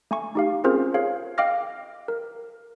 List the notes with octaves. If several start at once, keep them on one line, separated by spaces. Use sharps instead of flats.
A3 G#5 C#6
D#4 G4 F5
C4 C#4 F4 G#4 A#4 C5
G#4 A#4 C#5 F5
D#5 F5 G5 D6 F6 A#6
A#4